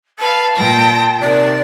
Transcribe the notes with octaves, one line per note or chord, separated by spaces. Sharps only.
B4 F5 A5
A#2 G5 A#6
C3 D#3 D5